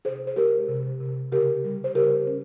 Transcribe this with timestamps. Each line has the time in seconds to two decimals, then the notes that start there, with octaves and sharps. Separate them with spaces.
0.05 C3 G#4 C5
0.27 C5
0.36 G#3 G4 A#4
0.68 C3
1.00 C3
1.32 C#3 G4 A#4
1.64 G3
1.84 C5
1.95 C#3 G4 A#4
2.27 C#4